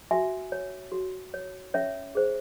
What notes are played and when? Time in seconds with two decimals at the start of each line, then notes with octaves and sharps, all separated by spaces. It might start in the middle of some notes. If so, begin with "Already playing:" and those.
0.11 F#4 E5 G#5
0.52 C#5
0.92 F#4
1.34 C#5
1.74 C#4 C#5 E5
2.15 G#4 C5